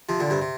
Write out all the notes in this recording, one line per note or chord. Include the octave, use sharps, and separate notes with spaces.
C3 F3
A#2 D3
G2 C3
C3